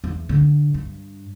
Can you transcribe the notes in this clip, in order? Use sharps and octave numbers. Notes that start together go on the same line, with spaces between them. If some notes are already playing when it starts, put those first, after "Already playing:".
E2
D3
G2